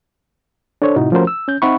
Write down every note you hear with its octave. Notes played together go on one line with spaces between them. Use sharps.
D4 A4 C5 C#5
A2 C3 D#4 E4 F#4
F3 A3 C#4 F#4 A#4 C5
E6
C#4 G6
C4 D#4 E5 F#5 B5 C#6